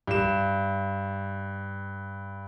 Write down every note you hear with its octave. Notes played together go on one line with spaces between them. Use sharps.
G2 E7